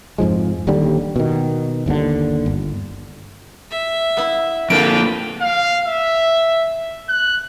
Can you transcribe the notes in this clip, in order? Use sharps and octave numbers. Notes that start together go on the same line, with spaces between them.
F2 G#2 F3 G#3
D#1 D#2 D3 G3
B2 D#3
G1 D#2 B2 D3
G1
E5
B3 E4
F2 A#2 D3 A#3 B4 G5 D7
F5
E5
F#6